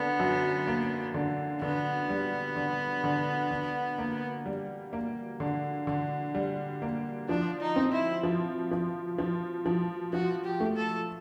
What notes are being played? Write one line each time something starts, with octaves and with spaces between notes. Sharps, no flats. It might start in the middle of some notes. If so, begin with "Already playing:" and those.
Already playing: D3 B3
F#2
A#3
D3
D3 B3
G3
D3
D3
D3
A#3
G3
A#3
D3
D3
G3
A#3
F3 D4
D#4
C4
E4
F3
F3
F3
F3
F3 F#4
G4
A3
A4